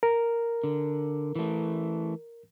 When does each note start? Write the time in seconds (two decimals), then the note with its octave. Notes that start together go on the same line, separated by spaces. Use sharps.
0.03 A#4
0.64 D3
1.35 E3 A3